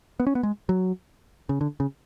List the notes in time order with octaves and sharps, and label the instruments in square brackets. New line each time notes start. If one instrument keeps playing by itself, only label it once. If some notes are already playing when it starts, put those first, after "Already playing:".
[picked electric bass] B3
C#4
B3
G#3
F#3
C#3
D3
C#3